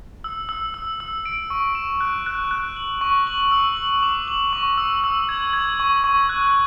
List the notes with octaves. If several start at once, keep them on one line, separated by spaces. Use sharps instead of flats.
E6
E6
E6
E6
D7
C#6
E7
F#6
F#6
F#6
F#7
C#6
F#7
E6
F#7
D6
F#7
C#6
E6
E6
G#6
G#6
C#6
C#6
F#6